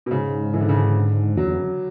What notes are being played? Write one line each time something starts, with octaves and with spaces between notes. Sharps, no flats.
B2
G#2 C#3
E3
D3
C#3
D3
E2 F#3
E2
F#2